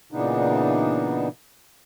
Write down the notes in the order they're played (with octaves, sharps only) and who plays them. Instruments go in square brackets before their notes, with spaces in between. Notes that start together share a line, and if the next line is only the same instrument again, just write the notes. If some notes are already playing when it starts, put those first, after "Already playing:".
[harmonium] A#2 C#3 E3 B3 D4 D#4